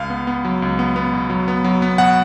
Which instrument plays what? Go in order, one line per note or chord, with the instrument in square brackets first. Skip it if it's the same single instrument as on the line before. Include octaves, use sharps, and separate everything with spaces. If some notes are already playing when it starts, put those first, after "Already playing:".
Already playing: [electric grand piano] C#2 F5
B3
B3
F#3
C#2
B3
B3
B2
F#3
B3
F#3
B3
B2 F#5